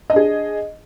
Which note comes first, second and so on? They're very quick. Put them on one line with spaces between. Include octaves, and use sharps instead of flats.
D#5 D4 G#4